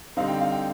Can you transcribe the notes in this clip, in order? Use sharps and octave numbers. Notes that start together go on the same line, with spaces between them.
D3 G3 C4 D#4 F5
G5
F5
G5